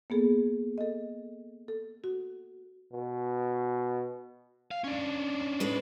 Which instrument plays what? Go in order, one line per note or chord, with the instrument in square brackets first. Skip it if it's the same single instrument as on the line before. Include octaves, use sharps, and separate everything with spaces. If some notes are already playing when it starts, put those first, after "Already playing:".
[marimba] A#3 B3 G#4 A4
A4 D#5
A4
F#4
[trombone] B2
[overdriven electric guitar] F5
C#4 D4
[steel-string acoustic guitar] A2 G#3 B4